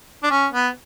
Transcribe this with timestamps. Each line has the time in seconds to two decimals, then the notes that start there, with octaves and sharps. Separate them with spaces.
0.23 D4
0.31 C#4
0.53 B3